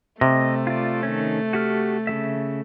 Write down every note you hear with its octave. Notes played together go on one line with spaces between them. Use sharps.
C3 A3 D#5
F4 D5
D#3 C#4
F#4 G4 F6
C#3 G3 E5